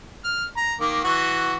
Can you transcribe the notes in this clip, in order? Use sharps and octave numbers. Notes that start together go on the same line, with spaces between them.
F6
A#5
D#3 A#3 D6
E3 F#4